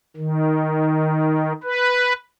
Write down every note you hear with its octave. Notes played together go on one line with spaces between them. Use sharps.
D#3
B4